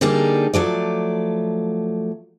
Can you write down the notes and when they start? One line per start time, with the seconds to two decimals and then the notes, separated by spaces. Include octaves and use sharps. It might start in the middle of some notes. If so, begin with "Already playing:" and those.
0.01 D3 G3 A#3 D4 D#4 G#4
0.53 F3 F#3 A3 D5